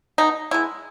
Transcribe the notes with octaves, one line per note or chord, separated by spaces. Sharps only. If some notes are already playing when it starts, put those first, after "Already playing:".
B2 D#4
G#3 B3 E4